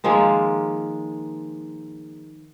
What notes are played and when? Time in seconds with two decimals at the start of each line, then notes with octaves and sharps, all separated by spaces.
0.04 D#3 F3 G#3 A#3